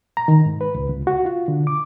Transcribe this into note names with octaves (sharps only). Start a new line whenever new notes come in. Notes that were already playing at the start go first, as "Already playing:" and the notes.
A#5
D#3
G#2
B4
C#2
C#2
F#4
F4
D3
D6